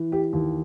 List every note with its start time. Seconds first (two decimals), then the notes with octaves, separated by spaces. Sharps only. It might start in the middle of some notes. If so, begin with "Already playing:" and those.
Already playing: E3
0.12 G4
0.33 D#2